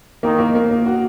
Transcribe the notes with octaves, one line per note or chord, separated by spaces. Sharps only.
D#3 A#3
A#3
A#3
A#3
F#4